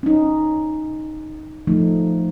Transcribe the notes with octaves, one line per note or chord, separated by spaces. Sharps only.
C#4 D#4
F3 A3 D#4